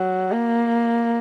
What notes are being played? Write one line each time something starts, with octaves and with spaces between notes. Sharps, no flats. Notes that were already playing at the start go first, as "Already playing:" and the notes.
Already playing: F#3
A#3